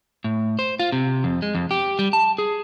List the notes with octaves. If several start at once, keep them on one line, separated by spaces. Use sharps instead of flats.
A2
C5
F4
C3
F2
G#3
F2
G4
G3
A5
G#4